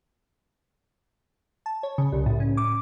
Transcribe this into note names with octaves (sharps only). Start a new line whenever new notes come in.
A5
C#5
C#3
C2
A2
C#4
D6